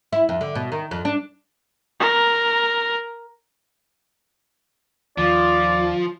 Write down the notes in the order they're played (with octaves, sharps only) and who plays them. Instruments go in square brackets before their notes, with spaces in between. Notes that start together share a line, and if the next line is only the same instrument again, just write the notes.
[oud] E4
F2
D3
B2
D#3
F2
D4
[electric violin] A#4
[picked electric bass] D#2 D#3 [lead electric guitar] F3 [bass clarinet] F4 [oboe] D5